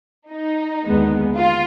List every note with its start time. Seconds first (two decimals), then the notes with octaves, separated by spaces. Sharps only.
0.31 D#4
0.84 D#2 D3 G#3 B3
1.37 F4